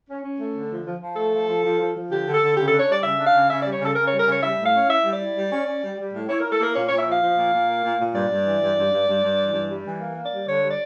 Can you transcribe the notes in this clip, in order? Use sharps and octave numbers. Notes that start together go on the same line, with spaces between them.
C#4
C#4
A3
D3
F3
F3
F3
A3 A4
F3
F3
F3
F3
F3
D3 G4
D3
A4
D3
C#3 G4
D4 A4
C#5
G3 D5
C#3 E5
D4
F5
C#3
C#3 E5
G3 D5
C#5
C#3 A4
C#3 A#4
G3 C#5
A#4
C#3 C#5
G3 E5
A2
F5
C#4
E4 E5
G3
D5
E4
G3
C#4
C#4
G3
G3
A2
E4 C#5
E4 A#4
A4
A#3 A#4
A#2 C#5
A#2 C#5
E5
F3 F5
F3
A#2
A#2
A#3
A#2
A#2
G2 D5
G2
E3
G2
G2
G2
G2
G2
E3
G2
G3
E3
A#3
A#3
D5
G3
D3 C#5
G3
D5